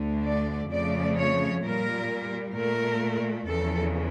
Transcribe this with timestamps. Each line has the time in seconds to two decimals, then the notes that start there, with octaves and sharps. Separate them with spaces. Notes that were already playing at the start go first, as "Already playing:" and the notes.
Already playing: D2 D3 A3
0.25 D5
0.70 F2 C#3 F3 A3 D5
1.17 C#5
1.63 A#2 G3 A#4
2.54 A#2 A3 A#4
3.46 E2 C#3 F3 A4